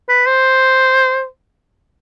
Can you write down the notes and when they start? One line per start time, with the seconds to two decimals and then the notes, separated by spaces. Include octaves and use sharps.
0.09 B4
0.27 C5